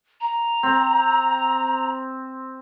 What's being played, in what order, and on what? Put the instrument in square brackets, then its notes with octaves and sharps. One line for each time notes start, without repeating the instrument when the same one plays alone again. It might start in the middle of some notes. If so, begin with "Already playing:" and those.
[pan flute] A#5
[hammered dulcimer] C4